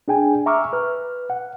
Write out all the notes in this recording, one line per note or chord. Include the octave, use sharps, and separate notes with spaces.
D4 G#4 G5 G#5
E5 A#5 C#6 D6 E6 F6
B4 F6
F#5